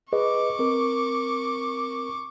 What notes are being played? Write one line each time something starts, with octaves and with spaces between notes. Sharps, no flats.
G#4 B4 D#5 C#6 D6
C4 A#4